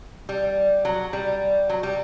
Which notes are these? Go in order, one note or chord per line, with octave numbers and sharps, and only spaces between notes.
G3
F#3
G3
F#3
G3